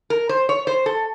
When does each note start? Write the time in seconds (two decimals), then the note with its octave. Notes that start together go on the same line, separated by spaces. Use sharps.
0.10 A#4
0.29 C5
0.49 C#5
0.67 C5
0.86 A4